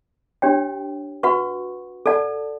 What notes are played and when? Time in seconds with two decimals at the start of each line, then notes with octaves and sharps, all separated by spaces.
0.42 D4 G4 C#5 G5
1.23 F#4 B4 F#5 C#6
2.06 A4 D5 F#5 A5